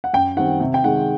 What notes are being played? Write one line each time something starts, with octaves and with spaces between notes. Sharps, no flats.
F#5
F#2 G5
D#3 G3 C4 F#5
C3
G5
D#3 G#3 F#5